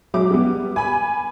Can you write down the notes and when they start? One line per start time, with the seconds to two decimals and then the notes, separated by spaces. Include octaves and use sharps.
0.14 F#3 G#3 E5 D6
0.31 G3 B3
0.76 G#5 B5